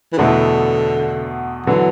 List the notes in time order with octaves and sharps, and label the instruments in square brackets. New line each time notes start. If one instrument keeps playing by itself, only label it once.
[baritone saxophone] E3
[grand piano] E2 B2 A3 E4 [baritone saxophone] D3
[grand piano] D3 F#3 B3 [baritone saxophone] E3